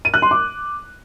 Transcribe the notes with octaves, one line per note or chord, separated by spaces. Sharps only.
D#7
F#6
C6
D6